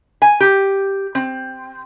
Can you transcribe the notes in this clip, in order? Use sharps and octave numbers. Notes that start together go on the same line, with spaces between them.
G#5
G4
C4